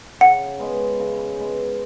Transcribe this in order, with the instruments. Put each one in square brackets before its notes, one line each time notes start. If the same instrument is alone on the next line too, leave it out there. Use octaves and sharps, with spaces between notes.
[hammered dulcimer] C#3 [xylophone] F#5
[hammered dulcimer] G#3 B3
C#3
G#3 B3